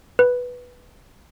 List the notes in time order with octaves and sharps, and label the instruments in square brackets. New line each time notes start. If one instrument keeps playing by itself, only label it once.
[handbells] B4